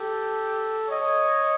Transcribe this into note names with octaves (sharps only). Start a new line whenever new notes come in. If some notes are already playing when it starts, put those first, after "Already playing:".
Already playing: G4 A4
C#5 D#5